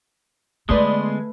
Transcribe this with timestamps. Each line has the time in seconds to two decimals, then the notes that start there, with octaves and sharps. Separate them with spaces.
0.69 D3 G#3 A3 B3 B4 D5 C6 D#6